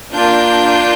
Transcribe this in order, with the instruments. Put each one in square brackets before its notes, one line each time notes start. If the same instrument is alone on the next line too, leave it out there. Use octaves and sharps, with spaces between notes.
[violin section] A#3 D4 F4 G6